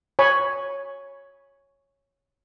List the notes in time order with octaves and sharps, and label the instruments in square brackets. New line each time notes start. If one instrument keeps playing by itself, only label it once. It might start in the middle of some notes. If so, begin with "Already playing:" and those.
[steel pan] C#5 G#5 B5